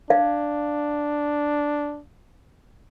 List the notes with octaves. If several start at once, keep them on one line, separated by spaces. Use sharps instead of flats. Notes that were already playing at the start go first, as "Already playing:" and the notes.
D4 D5 F5